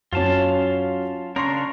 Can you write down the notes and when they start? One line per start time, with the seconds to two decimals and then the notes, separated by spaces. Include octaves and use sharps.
0.13 F#2 F#3 C#4 F4 F5 A5
1.36 C#3 C#4 D4 A#4 C6 C#6 A#6